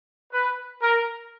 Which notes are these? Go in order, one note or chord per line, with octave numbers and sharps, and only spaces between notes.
B4
A#4